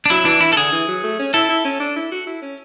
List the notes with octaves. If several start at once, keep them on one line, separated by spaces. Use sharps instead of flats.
D4
F#3 E4
E3 D4
E3 E4
A4
D3 G#4
E3
F#3
A3
C#4
E4 A4
E4
C#4
D4
E4
F#4
E4
C#4